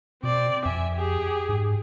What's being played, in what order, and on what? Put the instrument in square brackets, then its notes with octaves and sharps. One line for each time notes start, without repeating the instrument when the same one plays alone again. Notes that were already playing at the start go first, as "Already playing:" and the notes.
[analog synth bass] B2 [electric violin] C4 D5
[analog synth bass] F2 [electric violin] E5 G#5
[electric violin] G4 G#4
[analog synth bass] G#2